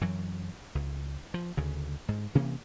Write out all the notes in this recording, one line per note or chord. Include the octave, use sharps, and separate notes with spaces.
F#2 E3 F#3
C#2
F3
D2 C#3
G#2
C3 E3 A#3 C#4